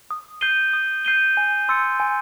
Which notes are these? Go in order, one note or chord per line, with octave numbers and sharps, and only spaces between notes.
D#6
G6 C7 D#7 G7
D#6
G6 C7 D#7 G7
G#5
C6 E6 A6 C#7
G#5